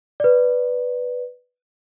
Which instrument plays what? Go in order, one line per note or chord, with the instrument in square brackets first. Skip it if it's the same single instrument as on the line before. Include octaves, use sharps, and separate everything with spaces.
[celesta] B4 D5